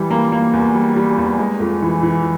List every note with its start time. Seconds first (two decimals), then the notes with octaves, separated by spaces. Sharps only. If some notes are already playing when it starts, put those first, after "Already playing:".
Already playing: E3 G3
0.10 A#3
0.32 A#3
0.53 E2
0.75 G3
0.96 G3
1.18 E2
1.39 G#3
1.60 F2
1.82 E3
2.03 E3